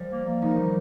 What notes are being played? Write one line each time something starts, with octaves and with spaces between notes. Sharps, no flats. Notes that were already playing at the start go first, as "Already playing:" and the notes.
Already playing: F3 G3
A#3
A#3
D#3 F3 D#4
G3